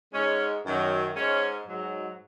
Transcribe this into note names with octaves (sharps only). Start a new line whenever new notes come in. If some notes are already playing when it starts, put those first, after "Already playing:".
G#2 G#3 C#4
F#2 D#3 F#3
G#2 G#3 C#4
G#2 F#3